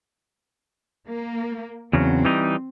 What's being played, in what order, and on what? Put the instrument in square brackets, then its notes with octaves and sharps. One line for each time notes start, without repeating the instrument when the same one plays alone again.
[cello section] A#3
[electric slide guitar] E2 C#3 F#3 [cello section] C4
[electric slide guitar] E3 G3 D#4